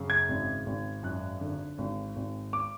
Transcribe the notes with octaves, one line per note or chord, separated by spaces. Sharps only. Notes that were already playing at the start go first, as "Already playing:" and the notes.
Already playing: F#2 C#3
G#6
G#1
G#1
F#2 F#6
D3
G#1
G#1
D6